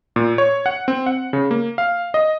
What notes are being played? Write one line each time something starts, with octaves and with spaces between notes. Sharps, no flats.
A#2
C#5
F#5
C4
F#5
C#3
A#3
F5
D#5